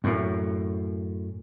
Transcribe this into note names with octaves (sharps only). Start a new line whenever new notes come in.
F#2 A2